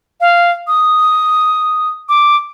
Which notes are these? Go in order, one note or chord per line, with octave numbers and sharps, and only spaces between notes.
F5
D#6
D6